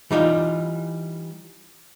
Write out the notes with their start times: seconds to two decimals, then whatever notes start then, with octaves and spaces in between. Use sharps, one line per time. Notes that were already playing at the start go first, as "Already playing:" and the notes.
0.11 E3 G3 D#4 F4